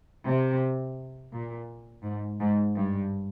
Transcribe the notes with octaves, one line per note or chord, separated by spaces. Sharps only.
C3
A#2
G#2
G#2
G2